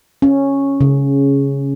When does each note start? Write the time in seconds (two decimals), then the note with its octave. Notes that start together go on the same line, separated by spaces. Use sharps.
0.22 C#4
0.81 C#3